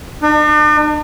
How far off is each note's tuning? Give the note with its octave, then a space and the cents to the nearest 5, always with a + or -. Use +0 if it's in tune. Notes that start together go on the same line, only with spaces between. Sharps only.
D4 +45